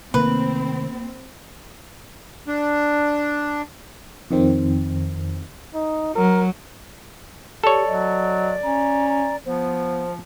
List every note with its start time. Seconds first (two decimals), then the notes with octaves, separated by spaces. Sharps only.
0.14 C3 D#3 A3 A#3 C4 B4
2.47 D4
4.30 F2 D#3 C4
5.74 D#4
6.15 F#3 A#4
7.64 G4 A4 C#5 D5
7.88 F#3 D#5
8.63 C#4 A#5
9.09 A#5
9.46 F3 B3 C5